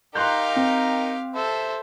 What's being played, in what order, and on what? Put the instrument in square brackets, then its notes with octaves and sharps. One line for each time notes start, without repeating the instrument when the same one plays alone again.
[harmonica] D#4 A#4 [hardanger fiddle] G4 F5 [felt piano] C6 F#6 G6
[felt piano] C4
[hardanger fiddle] A4 [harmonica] C5 E5